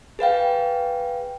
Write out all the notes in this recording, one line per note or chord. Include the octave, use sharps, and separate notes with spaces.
G#4 B4 F5 G5